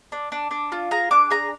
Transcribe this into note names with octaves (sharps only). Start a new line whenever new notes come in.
D4
D4
D4
F4
G#4 A#5
D4 D6
G#4 A#5